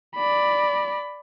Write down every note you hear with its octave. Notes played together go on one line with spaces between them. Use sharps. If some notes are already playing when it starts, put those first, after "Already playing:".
D5 B5